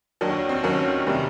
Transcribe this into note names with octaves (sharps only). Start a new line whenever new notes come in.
D#2 D#3 F#3 D4
C4
D#2 D#3 F#3 C#4
C3 D#3 G3